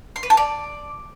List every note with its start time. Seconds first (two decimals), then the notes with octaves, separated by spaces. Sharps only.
0.16 C6
0.23 B4
0.30 A5
0.37 D5